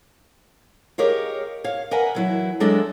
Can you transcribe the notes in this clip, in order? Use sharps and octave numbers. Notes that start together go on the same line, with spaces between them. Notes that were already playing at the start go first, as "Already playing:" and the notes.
G4 G#4 A#4 C#5 D#5 F5
C#5 F5
A#4 B4 D#5 F#5 G#5 A#5
E3 F#3 E4
F#3 G#3 D4 A4 D#5 E5